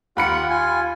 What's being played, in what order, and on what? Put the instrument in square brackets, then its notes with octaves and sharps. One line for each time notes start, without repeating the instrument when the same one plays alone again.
[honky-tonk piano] D#2 B5 C#7 [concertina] F4 F#5
[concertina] F4 G#5